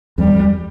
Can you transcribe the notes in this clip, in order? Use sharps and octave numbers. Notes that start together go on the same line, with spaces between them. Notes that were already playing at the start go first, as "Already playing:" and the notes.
F2 G3
E2
F2